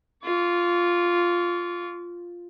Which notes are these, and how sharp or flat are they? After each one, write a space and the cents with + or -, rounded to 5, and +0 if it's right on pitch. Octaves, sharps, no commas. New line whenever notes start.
F4 +0 C#6 +45